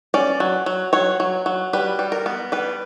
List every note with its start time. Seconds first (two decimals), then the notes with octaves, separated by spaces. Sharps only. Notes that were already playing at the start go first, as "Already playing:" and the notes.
0.14 C#4 D5
0.40 F#3
0.66 F#3
0.93 F#3 C#5
1.20 F#3
1.46 F#3
1.73 G3 B4
1.99 G3
2.12 A#4
2.26 B3
2.52 G3 B4